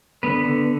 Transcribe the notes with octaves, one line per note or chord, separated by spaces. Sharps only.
D3 B3 B4
D3